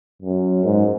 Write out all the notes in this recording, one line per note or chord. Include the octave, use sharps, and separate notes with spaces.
F#2
G#2